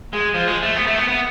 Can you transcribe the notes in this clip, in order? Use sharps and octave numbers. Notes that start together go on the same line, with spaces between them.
G#3
F3
G#3
A3
B3
A3
B3
B3